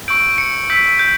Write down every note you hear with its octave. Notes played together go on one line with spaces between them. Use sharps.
C#6 E6 G6 D7
C#7
C#6 E6 G6 B6
G6